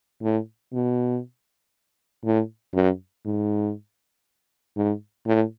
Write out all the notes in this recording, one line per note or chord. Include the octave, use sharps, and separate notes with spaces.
A2
B2
A2
F#2
G#2
G#2
A2